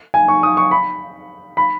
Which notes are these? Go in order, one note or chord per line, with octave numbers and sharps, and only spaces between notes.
G#5
C#6
D#6
C#6
B5
B5